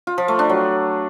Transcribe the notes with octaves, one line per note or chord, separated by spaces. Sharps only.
F4
F3
A3
D4
F#3